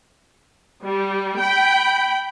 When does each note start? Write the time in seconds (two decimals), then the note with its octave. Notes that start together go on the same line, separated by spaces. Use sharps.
0.85 G3
1.40 G5 B5